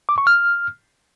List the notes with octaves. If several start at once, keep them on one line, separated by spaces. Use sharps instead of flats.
D6
C#6
F6